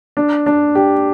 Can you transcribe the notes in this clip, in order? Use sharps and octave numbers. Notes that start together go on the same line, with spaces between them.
D4
D4
G4